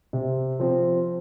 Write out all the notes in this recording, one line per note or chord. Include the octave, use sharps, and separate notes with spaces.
C3
F3 C4